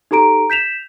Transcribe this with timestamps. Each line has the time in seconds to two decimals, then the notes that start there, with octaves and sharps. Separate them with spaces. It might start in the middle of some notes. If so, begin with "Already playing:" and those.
0.11 D#4 G4 A4 A#5 D7
0.50 G6 B6 E7 F7